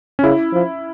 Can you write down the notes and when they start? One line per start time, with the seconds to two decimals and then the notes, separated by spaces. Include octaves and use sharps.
0.19 C#4
0.24 C#3 E4
0.53 F3